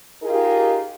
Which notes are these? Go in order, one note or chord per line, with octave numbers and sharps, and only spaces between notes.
D#4 F4 G4 G#4 A#4